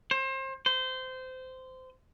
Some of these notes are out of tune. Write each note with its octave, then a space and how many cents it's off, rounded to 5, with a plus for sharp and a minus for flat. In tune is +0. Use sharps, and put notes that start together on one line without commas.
C5 +30
C5 -20